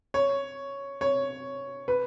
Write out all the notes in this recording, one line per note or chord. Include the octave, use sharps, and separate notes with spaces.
C#5
C#5
B4